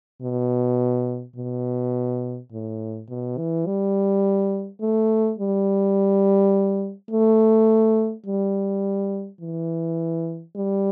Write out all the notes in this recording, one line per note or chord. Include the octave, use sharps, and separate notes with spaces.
B2
B2
A2
B2
E3
G3
A3
G3
A3
G3
E3
G3